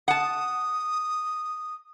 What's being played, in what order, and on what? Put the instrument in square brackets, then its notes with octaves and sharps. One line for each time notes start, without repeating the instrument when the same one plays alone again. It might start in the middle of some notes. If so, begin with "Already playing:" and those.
[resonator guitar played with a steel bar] F#5 A5 [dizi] D#6